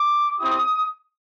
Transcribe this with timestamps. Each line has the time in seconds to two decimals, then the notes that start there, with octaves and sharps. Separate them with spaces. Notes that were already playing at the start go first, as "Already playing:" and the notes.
Already playing: D6
0.40 C4 E4 G4 D#6